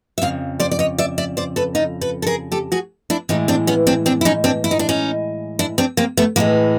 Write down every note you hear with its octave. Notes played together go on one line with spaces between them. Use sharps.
E5
F2 C#3 F5
C5 D5
D5
C#5 D#5
D5 E5
D5 E5
C5 D5
A4 B4
D#4 F4
A4 B4
A4
G#4 A#4
G4 A4
F#4 G#4
D4 E4
A2 E3 G#3 C#4 D#4
C4 D4
B3 C#4
C4 D4
C4 D4
E4
C#4 D#4
C4 D4
E4
D#4
D4
C#4 D#4
D4 E4
C4 D4
A#3 C4
A3 B3
A2 E3 G#3 A#3